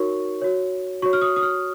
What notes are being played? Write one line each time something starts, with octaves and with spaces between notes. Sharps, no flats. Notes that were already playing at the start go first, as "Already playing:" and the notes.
Already playing: D#4 F#4 A#4 C#5 C#6
F#4 C#5
F#4 C#5 C#6
F6
D#6
D#6
F6